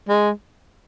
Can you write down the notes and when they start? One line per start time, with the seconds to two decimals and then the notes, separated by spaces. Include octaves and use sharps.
0.09 G#3